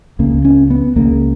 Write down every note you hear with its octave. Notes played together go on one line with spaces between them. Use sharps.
C#2 C#3 A#3
C#4
B3
C#2 C#3 A#3